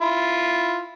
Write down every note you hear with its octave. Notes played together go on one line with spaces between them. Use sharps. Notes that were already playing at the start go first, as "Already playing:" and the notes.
E4 F4